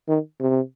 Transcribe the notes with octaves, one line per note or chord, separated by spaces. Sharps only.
D#3
C3